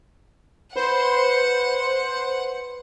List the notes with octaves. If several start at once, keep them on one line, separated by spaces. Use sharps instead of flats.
B4 C5 D5 F#5